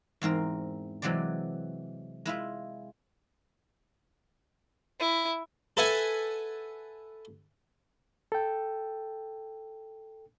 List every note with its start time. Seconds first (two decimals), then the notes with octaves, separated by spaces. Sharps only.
0.22 E2 G#2 C4 A#4
1.02 C3 E3 F#3 G#3 C4 D5
2.25 G#3 E4 F4 E5
4.99 E4
5.77 A4 B4 E5 F#5 G#5
8.32 A4 G5